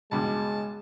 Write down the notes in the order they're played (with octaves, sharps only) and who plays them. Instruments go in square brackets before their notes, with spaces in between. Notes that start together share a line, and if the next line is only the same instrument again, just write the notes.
[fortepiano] C#2 G2 B2 [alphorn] G#3 [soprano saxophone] A5